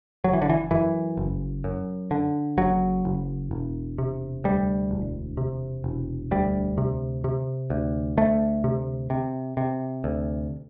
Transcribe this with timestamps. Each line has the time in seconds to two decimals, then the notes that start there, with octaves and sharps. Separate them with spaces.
0.24 F#1 F#3
0.33 E3
0.42 D3
0.49 E3
0.71 F#2 E3
1.17 F#1
1.64 F#2
2.11 D3
2.58 F#1 F#3
3.05 F#1
3.51 E1
3.98 C3
4.44 D2 G3
4.91 E1
5.37 C3
5.84 E1
6.31 D2 G3
6.78 C3
7.24 C3
7.70 D2
8.17 D2 A3
8.64 C3
9.10 C3
9.57 C3
10.04 D2